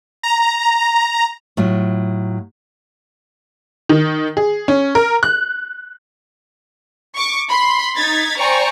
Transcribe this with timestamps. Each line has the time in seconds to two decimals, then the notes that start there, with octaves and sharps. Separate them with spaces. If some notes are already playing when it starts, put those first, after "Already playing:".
0.23 A#5
1.57 A2 F#3 F4 F#4
3.89 D#3
4.37 G#4
4.68 C#4
4.95 A#4
5.23 F#6
7.15 C#6 D6
7.49 B5 C6
7.95 D#4 G#6 A6 B6
8.38 C5 D5 G5 G#5 A#5 C#6